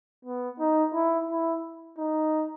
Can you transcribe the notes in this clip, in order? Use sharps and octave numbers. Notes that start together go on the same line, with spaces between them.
B3
D#4
E4
E4
D#4